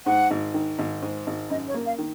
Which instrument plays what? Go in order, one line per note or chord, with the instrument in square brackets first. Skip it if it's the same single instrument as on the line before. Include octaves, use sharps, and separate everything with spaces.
[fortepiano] G#2 [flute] F#5
[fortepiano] G#1
D#3
G#1
G#2
G#1
[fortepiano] F#2 [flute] D#5
[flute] C#5
[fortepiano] A#3
[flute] F5
[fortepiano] D#3